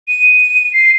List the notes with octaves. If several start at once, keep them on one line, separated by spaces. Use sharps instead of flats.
D#7
C7